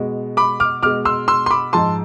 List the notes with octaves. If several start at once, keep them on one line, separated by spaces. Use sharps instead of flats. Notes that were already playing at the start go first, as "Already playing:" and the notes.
Already playing: B2 G#3
B5 D6
D6 F6
B2 G#3 D6 F6
C6 E6
C6 E6
C6
B5 D6
G#2 F3 G#3 A5 C6